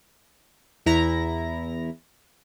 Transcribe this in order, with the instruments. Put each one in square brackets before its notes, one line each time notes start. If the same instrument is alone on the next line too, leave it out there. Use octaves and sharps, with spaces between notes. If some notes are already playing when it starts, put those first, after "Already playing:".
[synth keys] E2 E4 A#5 A#6